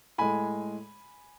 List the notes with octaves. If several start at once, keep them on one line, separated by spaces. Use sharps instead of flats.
A2 G#3 G#5 B5